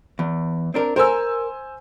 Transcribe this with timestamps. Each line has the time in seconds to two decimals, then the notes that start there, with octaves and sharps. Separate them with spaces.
0.19 E2
0.74 C4 D4 A#4
0.96 A#4 C5 G#5 E6